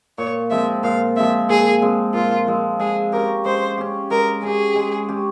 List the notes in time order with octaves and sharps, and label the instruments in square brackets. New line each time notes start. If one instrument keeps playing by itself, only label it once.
[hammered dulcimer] A#2 [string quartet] C#5
[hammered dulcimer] F3 G#3 C4 [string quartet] E5
[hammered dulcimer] A#2 [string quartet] F5
[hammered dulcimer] F3 G#3 C4 [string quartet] E5
[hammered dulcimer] A#2 [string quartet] G#4
[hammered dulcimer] F3 G#3 C4
[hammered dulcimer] A#2 [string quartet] F4
[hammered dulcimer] F3 G#3 C4
[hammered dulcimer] G#3 [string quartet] G#4
[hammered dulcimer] C#4 G4 [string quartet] A#4
[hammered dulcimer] G#3 [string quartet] C5
[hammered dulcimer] C#4 G4
[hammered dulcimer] G#3 [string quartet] A#4
[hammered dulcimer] C#4 G4 [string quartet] G#4
[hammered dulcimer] G#3
C#4 G4